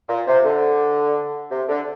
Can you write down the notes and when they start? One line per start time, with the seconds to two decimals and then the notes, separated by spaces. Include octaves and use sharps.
0.09 A#2
0.27 C3
0.44 D3
1.51 C3
1.69 D3